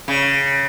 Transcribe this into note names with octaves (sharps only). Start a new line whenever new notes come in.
C#3